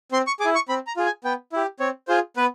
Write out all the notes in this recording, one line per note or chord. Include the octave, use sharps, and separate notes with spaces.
C4 C6
C#6
G#4 D6
E4
C#6
C4 B5
A#5
F4 G#4
G#5
B3 G5
E4 G4
C4 C#5
F4 G#4 C5
B3 B4